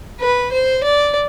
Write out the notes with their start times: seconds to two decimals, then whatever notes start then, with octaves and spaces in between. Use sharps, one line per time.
0.20 B4
0.52 C5
0.83 D5